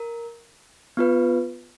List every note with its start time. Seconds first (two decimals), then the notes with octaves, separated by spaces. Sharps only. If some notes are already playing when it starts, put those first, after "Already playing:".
Already playing: A#4
0.97 B3 F4 B4